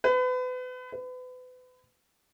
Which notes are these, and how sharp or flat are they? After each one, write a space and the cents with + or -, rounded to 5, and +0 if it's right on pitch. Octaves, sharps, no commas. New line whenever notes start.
B4 +35
B4 +35